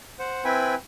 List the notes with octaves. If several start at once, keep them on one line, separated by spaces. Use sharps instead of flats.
C5 F#5
C4 E4 B4 G5 G#5 B5